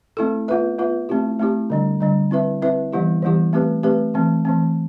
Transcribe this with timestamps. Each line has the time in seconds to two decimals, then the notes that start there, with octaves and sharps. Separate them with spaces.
0.17 A3 C4 E4 A4
0.48 B3 F4 B4 E5
0.79 B3 F4 B4 E5
1.09 A3 C4 E4 G4
1.39 A3 C4 E4 G4
1.70 D3 G3 D4
2.01 D3 G3 D4
2.31 C4 E4 B4 E5
2.62 C4 E4 B4 E5
2.93 E3 G3 B3 E4 G4
3.22 E3 G3 B3 E4 G4
3.53 A3 C4 G4 B4
3.83 A3 C4 G4 B4
4.14 E3 A3 C4
4.45 E3 A3 C4